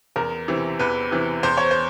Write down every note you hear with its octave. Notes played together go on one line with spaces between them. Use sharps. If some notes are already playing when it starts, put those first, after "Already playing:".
E2 A#4
C3 E3
E2 B4
C3 E3
E2 C5
C#5
C5